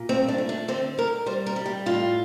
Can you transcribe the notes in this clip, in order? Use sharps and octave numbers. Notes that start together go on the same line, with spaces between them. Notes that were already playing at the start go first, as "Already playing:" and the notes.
Already playing: A#2
G2 C4
D4
A3
D4
D3 C4
G2 A#4
G3 C5
A#4
G3
G4
A2 F4